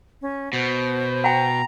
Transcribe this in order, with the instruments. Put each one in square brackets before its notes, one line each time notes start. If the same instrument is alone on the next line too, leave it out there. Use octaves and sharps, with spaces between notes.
[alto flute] C#4
[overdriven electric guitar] B2 [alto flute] C5
[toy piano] F#5 G5 [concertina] A#5